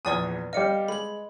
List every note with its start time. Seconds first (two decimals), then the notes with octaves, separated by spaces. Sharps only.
0.05 A#1 E2 B4 D5 G#5 D#6
0.53 G3 D5 D#5 F5 C#7
0.88 G#3 B5 F#7